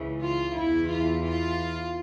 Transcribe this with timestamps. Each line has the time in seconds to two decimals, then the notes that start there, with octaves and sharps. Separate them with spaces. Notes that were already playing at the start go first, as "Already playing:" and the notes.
Already playing: C#2 C#3 E3
0.21 F4
0.55 E2 E3 E4
0.89 F4
1.23 F4